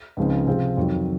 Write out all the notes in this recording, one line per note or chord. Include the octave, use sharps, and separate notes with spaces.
C#2 C#3 F3 C4 D#4
C3 F3 C4 F4 G#4
F2 D#3 F#3